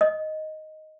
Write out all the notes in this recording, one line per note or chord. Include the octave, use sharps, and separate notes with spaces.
D#5